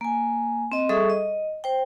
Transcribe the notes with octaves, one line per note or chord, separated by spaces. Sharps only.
A#3 G#5
C4 D#5
G3 G#4 A4 E5 C#6 D#6
D#5
C5 G5